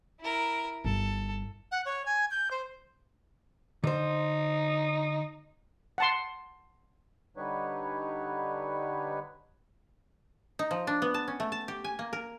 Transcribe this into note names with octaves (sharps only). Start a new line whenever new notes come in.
E4 A#4
G1 A4
F#5
C#5
G#5
G6
C5
D3 D#4 C5
F#5 A5 C6
D3 G3 D#4 B4 C#5
D#4
F3
D4
B3
A5
C#4
A3
A5
G4
G#5
A#3
A#4